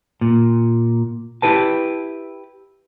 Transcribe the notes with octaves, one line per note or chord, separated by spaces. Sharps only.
A#2
E4 G4 B4 A5